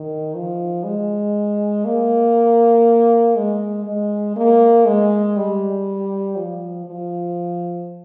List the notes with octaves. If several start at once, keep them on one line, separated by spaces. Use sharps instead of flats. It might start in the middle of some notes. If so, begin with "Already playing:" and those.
Already playing: D#3
F3
G#3
A#3
G#3
G#3
A#3
G#3
G3
F3
F3